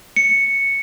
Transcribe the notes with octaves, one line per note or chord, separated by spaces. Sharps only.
C#7